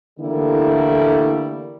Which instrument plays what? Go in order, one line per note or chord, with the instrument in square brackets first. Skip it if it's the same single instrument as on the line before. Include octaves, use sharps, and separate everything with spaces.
[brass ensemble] D3 E3 G3 A3 A#3 E4